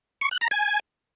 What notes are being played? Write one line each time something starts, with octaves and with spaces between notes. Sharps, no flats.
C#6
F#6
A#5
G#5